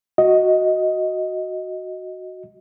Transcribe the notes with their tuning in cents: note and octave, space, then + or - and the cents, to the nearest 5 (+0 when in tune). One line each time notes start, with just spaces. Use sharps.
F#4 +0 D#5 +10